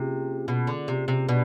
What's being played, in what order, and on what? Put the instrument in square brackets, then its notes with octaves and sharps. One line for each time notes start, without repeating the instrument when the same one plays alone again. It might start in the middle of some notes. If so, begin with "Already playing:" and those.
Already playing: [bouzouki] C3 [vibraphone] A#3 C#4 F4 G#4
[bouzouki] B2
D3
C3
C3
[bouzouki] B2 [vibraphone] D4 G4 B4 D5